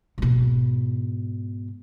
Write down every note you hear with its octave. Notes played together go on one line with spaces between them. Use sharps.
G#2 B2